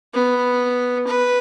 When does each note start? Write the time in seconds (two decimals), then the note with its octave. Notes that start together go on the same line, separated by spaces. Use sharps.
0.14 B3
1.07 B4